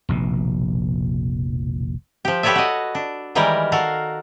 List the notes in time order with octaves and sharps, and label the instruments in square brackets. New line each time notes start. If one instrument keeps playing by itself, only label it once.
[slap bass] F1 A#1 B2
[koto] F3 G4
G4 A4 B4 C#5 D5 E5
F#4 D#5
D4
D#3 E3 G3 G#3 G4 A#4
F#4 A4 A#4 F5